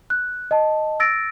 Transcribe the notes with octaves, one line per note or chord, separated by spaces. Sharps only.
F#6
D#5 A5
E6 A6 A#6 D7